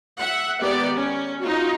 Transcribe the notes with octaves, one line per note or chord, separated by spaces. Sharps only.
E5 F#5
D#3 G#3 B3 G4 D5
C#4
D#4 F4 F#4